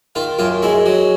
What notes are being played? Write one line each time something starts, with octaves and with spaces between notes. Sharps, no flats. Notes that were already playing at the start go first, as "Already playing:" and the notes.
D#3 F4
F#2 F4
G#3 E4
F#3